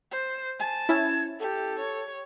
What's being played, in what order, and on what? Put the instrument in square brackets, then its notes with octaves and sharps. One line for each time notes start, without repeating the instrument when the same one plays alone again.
[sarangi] C5
[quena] G#5 [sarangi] A5
[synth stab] C#4 E4 [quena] G#6
[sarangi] G4 [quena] A4
[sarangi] C#5